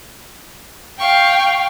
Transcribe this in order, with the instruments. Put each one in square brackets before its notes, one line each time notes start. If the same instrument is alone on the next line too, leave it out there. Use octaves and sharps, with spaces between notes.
[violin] F5 C#6 [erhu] G5